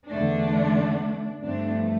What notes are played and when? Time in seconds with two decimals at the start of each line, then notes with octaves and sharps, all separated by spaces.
0.10 E2 D3 A3 D4
1.42 G2 F3 A3 C4 D4